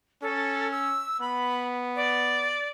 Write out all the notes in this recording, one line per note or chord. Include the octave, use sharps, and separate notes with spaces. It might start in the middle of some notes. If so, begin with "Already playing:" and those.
C#4 A4
E6
B3 B5
D5